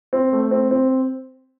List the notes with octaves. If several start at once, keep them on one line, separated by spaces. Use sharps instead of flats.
C4
A3
C4
C4